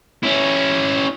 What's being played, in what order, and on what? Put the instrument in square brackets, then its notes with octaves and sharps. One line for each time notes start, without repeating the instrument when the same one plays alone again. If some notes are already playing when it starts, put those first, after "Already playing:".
[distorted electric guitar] C#4 E4